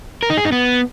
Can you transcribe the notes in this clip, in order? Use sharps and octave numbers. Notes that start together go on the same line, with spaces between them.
A#4
D#4
G#4
D#4
B3